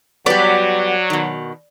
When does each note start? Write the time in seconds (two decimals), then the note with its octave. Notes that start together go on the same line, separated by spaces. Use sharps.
0.26 F#3 G3 B3 D5
1.10 B2 D#3